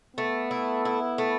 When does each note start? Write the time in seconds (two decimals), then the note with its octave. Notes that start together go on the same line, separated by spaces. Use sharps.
0.17 A3 B3
0.51 E4
0.85 E4
1.18 A3